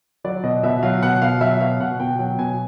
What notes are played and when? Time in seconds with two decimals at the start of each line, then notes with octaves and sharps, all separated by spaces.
0.24 F#3 D5
0.43 B2 D#5
0.63 B2 E5
0.83 F#3 F5
1.02 B2 F#5
1.22 B2 F5
1.41 F#3 E5
1.61 B2 F5
1.80 B2 F#5
2.00 B2 G5
2.19 F#3 G5
2.38 B2 G#5